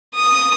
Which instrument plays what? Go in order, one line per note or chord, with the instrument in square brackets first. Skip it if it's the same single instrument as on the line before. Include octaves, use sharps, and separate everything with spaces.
[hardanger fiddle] D#6